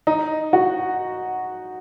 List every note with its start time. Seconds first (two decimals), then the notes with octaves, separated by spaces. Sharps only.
0.07 D#4
0.53 F#4